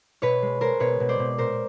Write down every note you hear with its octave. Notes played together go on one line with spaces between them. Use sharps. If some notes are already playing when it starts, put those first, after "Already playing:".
B2 B4 C#5
G#3
G#3 A#4 C5
B2 B4 C#5
B2
C5 D5
B2
A#2 A#4 C5